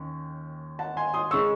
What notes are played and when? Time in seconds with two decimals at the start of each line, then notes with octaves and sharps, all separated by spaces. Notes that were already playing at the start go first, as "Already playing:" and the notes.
Already playing: D#2 D#3 C#4
0.79 F#5 A5
0.97 G#5 C6
1.14 C6 D#6
1.31 C#3 G#3 C#4 C#6 E6